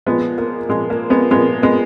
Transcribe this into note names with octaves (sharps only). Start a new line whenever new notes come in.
A#2 F3 G#3 B3
A#3
A#2 F3 G#3
A#3
G#3 B3
A#2 F3 G#3 B3
G#3 B3